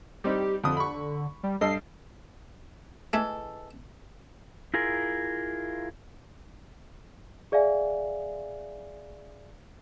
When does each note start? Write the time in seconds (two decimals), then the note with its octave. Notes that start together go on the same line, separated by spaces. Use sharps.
0.24 G3 C4 D#4 G4
0.64 F2 D3 D#6
0.77 B5 C#6
1.43 G3
1.61 G2 A4 D#5 C7
3.13 E3 G#3 A3 E4 A4
4.74 E4 F4 G#4 A#4
7.52 G#4 D5 E5 F5 G#5